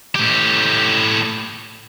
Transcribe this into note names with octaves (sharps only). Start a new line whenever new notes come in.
A2 G4